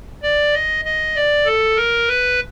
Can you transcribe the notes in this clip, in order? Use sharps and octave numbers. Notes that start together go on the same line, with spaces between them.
D5
D#5
D#5
D5
A4
A#4
B4